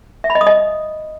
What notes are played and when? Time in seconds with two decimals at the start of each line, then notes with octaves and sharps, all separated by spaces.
0.24 E5
0.30 B5
0.35 D#5
0.41 D#6
0.47 D#5